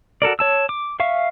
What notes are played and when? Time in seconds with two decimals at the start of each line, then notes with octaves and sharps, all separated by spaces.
0.22 F#4 A4 A#4 D5
0.39 C#5 A5 E6
0.69 D6
1.00 E5 F5 C#6